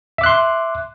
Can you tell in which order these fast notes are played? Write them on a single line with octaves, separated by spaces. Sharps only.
E5 D6 F#6 C6